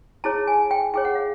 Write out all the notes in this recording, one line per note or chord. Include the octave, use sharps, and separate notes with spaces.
E4 G#4 C#5 A5
G#5
G5
E4 G#4 C#5 G5
F#5
F5